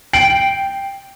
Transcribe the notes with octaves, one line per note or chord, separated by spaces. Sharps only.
G5 C7 D7 F#7